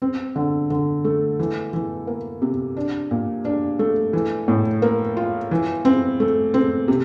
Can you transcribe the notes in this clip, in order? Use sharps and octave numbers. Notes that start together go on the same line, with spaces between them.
C4
D3
D3
A3
E3
E3
A#3
C3
D4
A#2
D4
A3
E3
A2
A#3
F4
E3
C4
A3
C4
C3